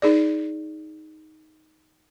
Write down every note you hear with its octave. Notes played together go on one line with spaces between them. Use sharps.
D#4 G#4 D5